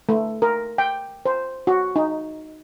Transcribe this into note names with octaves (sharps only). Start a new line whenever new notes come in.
A3
A#4
G5
C5
F#4
D#4